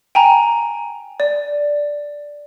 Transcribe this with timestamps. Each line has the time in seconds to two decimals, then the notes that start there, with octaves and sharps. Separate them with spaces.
0.15 G5 G#5 A#5
1.20 D5